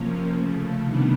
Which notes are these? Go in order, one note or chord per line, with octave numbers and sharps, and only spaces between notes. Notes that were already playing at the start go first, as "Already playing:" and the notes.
Already playing: C3 F3 A#3 C#4
C#3 F3 A3
C3 D#3 G3 B3 D4